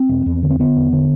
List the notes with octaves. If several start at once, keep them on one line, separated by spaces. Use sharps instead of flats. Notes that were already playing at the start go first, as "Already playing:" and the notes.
Already playing: C4
E1
E2
D3
C4
D3 B3
E2
D3